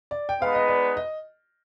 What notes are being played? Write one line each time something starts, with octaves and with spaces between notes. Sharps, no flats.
D5
G5
G#3 B3 D#4 B4 F5
D#5
D5
D#5